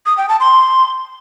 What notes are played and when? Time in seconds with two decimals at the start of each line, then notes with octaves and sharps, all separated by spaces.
0.06 D#6
0.17 G5
0.29 A5
0.40 C6